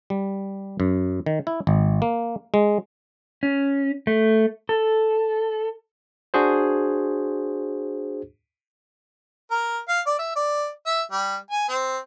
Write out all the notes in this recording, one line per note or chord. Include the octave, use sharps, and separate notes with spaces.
G3
F#2
D#3
E4
G#1
A#3
G#3
C#4
A3
A4
D4 F#4 G#4 C5
A#4
F5
D5
E5
D5
E5
G3
G#5
C4